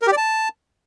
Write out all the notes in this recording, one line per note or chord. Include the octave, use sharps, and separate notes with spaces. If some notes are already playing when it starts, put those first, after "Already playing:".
A#4
G4
D5
A5